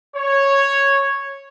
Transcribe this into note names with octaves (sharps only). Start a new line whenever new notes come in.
C#5